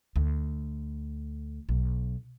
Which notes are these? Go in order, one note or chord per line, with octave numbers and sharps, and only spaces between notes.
D2
B1